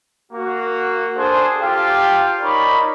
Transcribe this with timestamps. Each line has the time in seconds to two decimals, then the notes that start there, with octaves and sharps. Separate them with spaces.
0.32 A#3 F#4
1.16 D4 G#4 A4 C5
1.61 F4 G4 F5 G5 A5
2.41 D#4 A#4 C#5 D5 B5